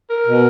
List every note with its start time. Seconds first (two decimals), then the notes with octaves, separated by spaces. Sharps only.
0.10 A#4
0.26 B2